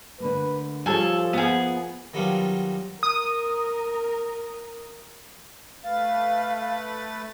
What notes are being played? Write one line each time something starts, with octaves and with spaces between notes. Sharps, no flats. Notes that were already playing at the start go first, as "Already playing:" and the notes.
D3 A3 A#3 B4
F3 G3 G#4 A4 C#5
A#3 B3 F4 G#4 F5
D#3 F#3 G3 B3 D4 F4
A#4 D#6
A3 B4 F5 A6